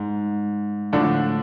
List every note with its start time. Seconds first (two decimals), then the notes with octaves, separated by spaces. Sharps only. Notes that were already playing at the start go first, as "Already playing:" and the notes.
Already playing: G#2
0.93 A2 D3 F3 D4